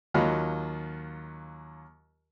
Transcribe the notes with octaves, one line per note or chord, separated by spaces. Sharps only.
D#2 F#3 F4 D#5 B5 F6